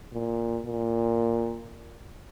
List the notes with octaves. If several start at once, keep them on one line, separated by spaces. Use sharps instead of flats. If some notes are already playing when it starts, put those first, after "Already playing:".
A#2
A#2